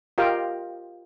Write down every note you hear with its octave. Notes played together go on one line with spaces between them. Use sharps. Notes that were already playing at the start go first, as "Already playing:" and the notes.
F4 G4 A#4 D#5 F5 G5